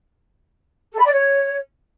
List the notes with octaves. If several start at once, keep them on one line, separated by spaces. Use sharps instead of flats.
A4
B5
D5
C#5